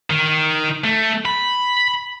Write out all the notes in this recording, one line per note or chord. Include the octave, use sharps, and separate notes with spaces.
D#3
A3
B5